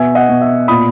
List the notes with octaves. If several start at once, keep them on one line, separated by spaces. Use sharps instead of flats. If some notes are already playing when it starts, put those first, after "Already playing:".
Already playing: B2 E5 G#5
D#5 F#5
B2
E5
A#2 B5 D#6